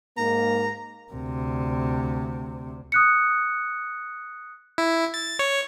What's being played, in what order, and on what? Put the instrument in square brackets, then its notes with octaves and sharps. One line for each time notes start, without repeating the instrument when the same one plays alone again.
[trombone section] G#2 A#3 [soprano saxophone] A#5
[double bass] D2 C3
[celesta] D#6 F#6 C#7
[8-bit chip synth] E4
A6
C#5